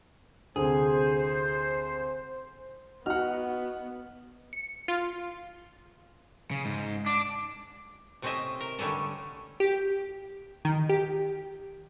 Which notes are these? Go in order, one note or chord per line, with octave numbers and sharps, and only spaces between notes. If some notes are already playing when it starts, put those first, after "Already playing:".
D2 C3 G#4 C5
B3 D#4 F#4 F#5 F6
C#7
F4
C#3
G#2
D4 D6
C3 A3 C4 C#4 D#5 E5
A#4
D3 G3 A3 C#4 A4
G4
D#3
G4